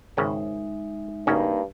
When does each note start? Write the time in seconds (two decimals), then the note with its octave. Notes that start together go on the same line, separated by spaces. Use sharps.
0.17 G#1 C#3 G#3 C#4 D#4 E5
1.27 G2 C#3 A#3 C#4 D#4 F#4